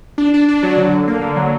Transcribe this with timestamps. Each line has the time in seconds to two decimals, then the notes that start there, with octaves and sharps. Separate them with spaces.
0.18 D4
0.34 D4
0.48 D4
0.63 F#3
0.77 D3
0.92 D3
1.08 A#3
1.21 D3
1.36 F#3